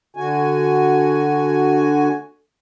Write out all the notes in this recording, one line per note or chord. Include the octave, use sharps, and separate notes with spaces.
D3 F#4 G#5